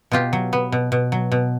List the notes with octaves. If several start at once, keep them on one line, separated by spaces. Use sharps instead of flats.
B2 F4 G4
F#3
B3
B2
B2
F#3
B2